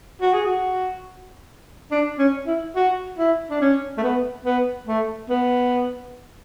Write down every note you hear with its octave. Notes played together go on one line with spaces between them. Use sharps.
F#4
G#4
F#4
D4
C#4
E4
F#4
E4
D4
C#4
A3
B3
B3
A3
B3